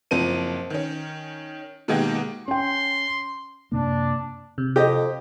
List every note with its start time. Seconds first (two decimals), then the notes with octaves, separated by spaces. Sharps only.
0.11 F#1 F3 C4 D#7
0.70 D#3 C#4
1.88 B2 D#3 G#3 A#3 F#4 G4
2.48 C#4 G5 C6
3.72 F#2 C3 A#3 D4
4.58 C3
4.76 F2 G4 D#5